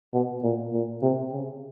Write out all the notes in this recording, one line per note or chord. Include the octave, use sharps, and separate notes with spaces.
B2
A#2
A#2
C3
C#3